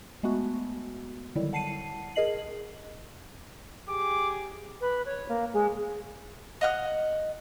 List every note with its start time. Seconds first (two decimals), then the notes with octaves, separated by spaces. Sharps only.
0.23 G#3 A3 B3 F#4
1.35 D3 D#3 F#3 G3 E4
1.53 F#5 A5 C7 C#7 D#7
2.15 G#4 A#4 D#5 C7 F#7
3.89 G4 G#4 D6
4.80 B4
5.05 C#5
5.28 A#3
5.53 G#3
6.61 D#5 F#5 F6